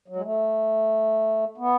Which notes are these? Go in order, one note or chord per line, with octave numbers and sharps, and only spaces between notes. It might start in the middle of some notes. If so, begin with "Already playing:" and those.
F#3
G#3
A3
B3